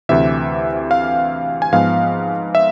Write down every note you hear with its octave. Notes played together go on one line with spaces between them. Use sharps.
D2 C3 E3 E5
F5
G#5
G#2 F3 B3 F5
E5